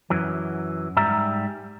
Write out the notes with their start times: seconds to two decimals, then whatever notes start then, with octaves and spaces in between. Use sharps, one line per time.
0.10 F#2 E3 F#3
0.97 G#2 G3 E5 A#5